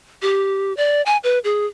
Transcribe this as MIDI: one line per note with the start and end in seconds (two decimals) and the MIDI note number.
0.22 0.75 67
0.77 1.02 74
1.06 1.17 80
1.24 1.39 71
1.44 1.66 68